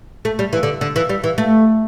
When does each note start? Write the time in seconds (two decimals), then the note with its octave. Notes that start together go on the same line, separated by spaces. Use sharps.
0.25 A3
0.39 G3
0.53 E3
0.63 D3
0.81 D3
0.96 E3
1.09 G3
1.24 E3
1.38 A3